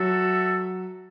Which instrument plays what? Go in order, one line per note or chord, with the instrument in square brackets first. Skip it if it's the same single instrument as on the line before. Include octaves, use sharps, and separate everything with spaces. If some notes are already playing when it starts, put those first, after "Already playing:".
Already playing: [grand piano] F#3 [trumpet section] F#4 A4 E5